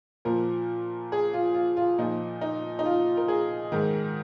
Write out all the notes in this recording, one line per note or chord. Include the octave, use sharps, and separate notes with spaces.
A#2 F3 A#4
G#4
F4
F4
F4
A#2 F3 D#4
D#4
D#4
F4
A#4
G#4
G#2 D#3